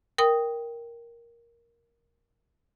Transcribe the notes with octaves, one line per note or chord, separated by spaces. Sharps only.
A#4 G5 D#6